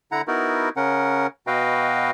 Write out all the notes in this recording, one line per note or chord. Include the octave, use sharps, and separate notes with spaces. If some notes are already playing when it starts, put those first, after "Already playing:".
D3 E4 F#5 A#5
B3 D#4 E4 F#4 A#4
C#3 C#4 A#4 F#5
B2 F#4 B4 D#5 F5 G5